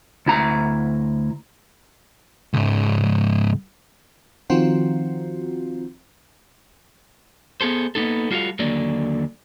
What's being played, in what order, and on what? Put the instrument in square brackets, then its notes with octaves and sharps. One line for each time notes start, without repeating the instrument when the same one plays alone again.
[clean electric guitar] D2 E4 A#5
[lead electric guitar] C#2 G#2
[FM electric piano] D#3 F3 C4 F4 F#4
[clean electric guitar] B3 G#4 A4 C5
A#3 B3 C#4 D#4 A4
G3 F4 F#4 A4 F5
D#2 D3 F#3 A#3 D5